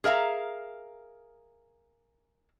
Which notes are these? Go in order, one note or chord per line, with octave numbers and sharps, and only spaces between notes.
G#4 A#4 E5 F5 A#5